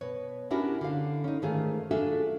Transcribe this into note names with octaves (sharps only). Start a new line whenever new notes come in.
B2 B4 C#5
C#4 D4 E4 F#4 G4 A#4
D3 F5
C#4 D#4
G#2 D#3 A3 F4 G#4 F5
D4 F4 F#4 G#4 A4 E5